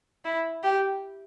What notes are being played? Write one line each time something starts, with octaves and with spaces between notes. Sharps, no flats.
E4
G4